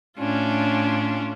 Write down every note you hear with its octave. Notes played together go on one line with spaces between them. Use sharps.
A2 C#4 D4 F4